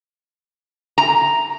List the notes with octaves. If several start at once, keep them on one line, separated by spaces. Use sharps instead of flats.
A#5